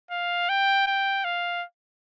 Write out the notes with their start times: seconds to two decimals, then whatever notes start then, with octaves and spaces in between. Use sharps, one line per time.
0.11 F5
0.49 G5
0.87 G5
1.25 F5